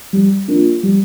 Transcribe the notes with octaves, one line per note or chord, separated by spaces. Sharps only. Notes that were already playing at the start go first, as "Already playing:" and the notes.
G3
A#3 D4 F4
G3